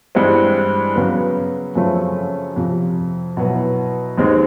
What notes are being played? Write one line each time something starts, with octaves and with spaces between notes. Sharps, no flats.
G2 E3 G#3 C4
C#3 F#3 B3
F#2 C#3 F3 A3 C4
F2 C3 F3
B2 F#3 B3 E4
D#2 D#3 G#3 C4